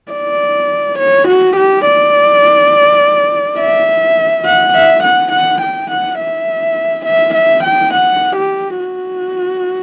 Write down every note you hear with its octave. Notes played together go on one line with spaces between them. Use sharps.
D5
C#5
F#4
G4
D5
E5
F#5
E5
F#5
F#5
G5
F#5
E5
E5
E5
G5
F#5
G4
F#4